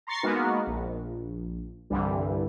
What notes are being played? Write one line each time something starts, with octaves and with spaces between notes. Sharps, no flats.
A#5 C6 C#6 A6 C7
G#3 A#3 B3 D#4 F#4 A#4
A#1
C2 G2 D3 E3 G3